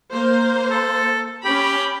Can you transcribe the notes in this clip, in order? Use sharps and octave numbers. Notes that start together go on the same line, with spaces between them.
A#3 C5
A4
C#4 G4 B5